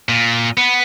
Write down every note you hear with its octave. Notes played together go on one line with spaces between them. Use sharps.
A#2
B3